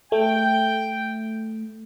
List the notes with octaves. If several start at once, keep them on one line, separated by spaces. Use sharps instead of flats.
A3 G5